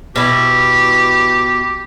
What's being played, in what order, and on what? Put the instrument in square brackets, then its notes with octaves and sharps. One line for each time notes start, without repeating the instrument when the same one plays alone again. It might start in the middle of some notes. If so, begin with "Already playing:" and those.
[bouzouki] B2 E4 [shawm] G4